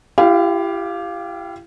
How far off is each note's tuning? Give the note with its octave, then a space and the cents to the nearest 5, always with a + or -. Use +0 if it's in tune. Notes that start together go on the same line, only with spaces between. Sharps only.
E4 +40 G4 +0 F5 +0